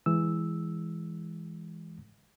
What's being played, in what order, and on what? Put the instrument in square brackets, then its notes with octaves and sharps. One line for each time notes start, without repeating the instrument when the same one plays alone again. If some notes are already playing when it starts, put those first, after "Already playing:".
[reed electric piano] E3 G#3 E6